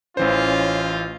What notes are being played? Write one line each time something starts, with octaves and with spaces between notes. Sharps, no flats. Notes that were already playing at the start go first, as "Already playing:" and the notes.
A1 E3 C#4 F4 C5